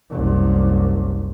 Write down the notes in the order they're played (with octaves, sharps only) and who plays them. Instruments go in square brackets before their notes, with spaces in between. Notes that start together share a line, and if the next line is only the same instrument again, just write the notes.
[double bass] F#1 C2